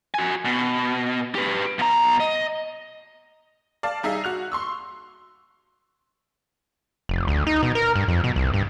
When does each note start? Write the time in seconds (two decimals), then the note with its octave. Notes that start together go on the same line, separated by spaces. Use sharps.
0.14 F#4 G#5
0.45 B2
1.35 G4 B4
1.79 B2 A#5
2.20 D#5
3.83 D5 F5 A5
4.03 G3 D#4 G#4 E5 F5
4.24 F#4 F#6 F7
4.52 C6 C#6 E6
7.09 F1
7.28 D2
7.47 D#4
7.63 B2
7.75 A#4
7.96 G2
8.08 F2
8.24 B2
8.36 C2
8.54 G2